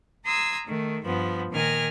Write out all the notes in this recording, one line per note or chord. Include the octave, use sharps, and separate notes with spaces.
A#5 C6 D#6 E6 G#6
D#3 A3
G2 F3 B3
A#2 D#3 G#5 F6 A#6